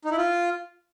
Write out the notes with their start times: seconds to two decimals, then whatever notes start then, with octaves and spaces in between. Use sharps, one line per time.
0.05 D#4
0.11 E4
0.17 F4